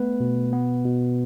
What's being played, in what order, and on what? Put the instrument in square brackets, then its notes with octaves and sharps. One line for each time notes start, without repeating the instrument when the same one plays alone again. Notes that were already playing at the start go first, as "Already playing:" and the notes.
Already playing: [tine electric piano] A3 B3 B4
B2
B3
B2